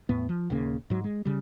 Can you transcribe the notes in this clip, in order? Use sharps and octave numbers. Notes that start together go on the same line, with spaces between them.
E2 A2 B3
F3
D#1 D#2 C#3 A#3
G#2 F#3
G#3
C#3 G3